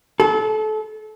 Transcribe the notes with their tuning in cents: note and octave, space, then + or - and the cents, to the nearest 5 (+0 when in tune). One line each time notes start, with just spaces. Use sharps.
A4 -30